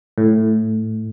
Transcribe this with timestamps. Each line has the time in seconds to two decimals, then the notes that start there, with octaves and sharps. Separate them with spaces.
0.18 A2